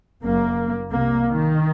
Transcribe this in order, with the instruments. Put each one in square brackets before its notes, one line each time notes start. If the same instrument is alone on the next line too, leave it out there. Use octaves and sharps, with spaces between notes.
[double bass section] F#1 F#2 A#3
C2 C3 A#3
D#3